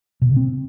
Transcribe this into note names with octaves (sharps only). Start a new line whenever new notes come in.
B2
C#3
C4